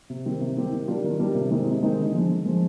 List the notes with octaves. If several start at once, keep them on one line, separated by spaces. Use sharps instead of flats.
C3
D#3 G3 C4 G4
C3
D#3 G3 C4 G4
D#3
G3 D4 F4 A#4
D#3
G3 D4 F4 A#4
C3
D#3 G#3 C4 D#4
C3
D#3 G#3 C4 D#4
D3
F3 G#3
D3
F3 G#3